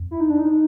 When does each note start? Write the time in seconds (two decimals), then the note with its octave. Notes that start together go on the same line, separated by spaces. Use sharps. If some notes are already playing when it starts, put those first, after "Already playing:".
Already playing: F2
0.11 E4
0.20 D#4
0.29 D4
0.39 D#4